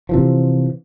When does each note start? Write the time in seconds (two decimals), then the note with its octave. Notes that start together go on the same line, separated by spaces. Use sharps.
0.09 C3 E3 F3